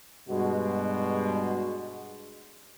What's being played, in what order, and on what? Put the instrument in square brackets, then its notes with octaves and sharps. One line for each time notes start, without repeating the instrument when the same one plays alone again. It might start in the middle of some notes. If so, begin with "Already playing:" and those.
[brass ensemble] G2 B2 G#3 F#4